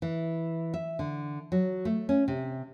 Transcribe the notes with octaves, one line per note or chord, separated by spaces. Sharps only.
E3
E5
D3
F#3
A3
C#4
C3